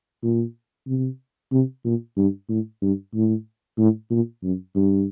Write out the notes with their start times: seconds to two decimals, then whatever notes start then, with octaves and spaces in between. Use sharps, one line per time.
0.23 A#2
0.87 C3
1.52 C3
1.85 A#2
2.17 G2
2.49 A2
2.82 G2
3.14 A2
3.79 A2
4.10 A#2
4.43 F#2
4.76 G2